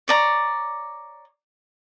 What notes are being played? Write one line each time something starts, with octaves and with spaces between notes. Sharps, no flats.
C#5 D5 A#5